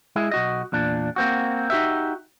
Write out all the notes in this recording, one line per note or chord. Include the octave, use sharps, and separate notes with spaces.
G#3 E4 G#4
B1 F#4 D#5
E2 A#2 D4
A#3 C4 F#4
D#4 F#4 G4 E5